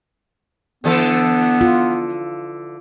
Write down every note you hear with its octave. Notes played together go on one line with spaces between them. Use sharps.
D3 E3 B3 A4
F4